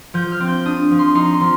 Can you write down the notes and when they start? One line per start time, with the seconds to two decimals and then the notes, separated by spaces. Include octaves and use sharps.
0.14 F3 G6
0.32 F6
0.40 C4
0.48 G6
0.65 D4 D#6
0.91 F3
0.99 C6
1.15 D#4 C6
1.33 C6
1.41 F3